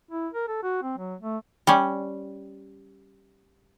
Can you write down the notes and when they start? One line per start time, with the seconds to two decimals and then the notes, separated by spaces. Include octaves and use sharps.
0.11 E4
0.33 A#4
0.48 A4
0.63 F#4
0.83 C4
0.98 F#3
1.21 A3
1.67 G3 C#4